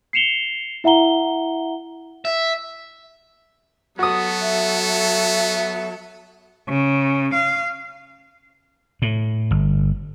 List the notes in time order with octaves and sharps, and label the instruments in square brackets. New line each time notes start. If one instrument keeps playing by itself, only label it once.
[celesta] C7 C#7 E7 F7 G7
E4 E5 F#5 A#5 G7
[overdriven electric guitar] E5
[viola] F#3 A4 [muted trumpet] B3 [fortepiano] F#4 D#6
[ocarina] E5
E5
[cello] C#3
F5
[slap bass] A2
G1